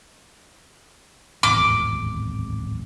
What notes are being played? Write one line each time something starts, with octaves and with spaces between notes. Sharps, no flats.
D1 G#1 E2 D6